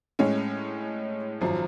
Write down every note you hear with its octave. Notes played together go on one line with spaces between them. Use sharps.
A2 G#3 C#4
G#1 F#2 F3